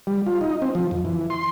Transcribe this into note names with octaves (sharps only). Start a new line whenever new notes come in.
G3
F4
D#4
C4
F3
F2
E3
C6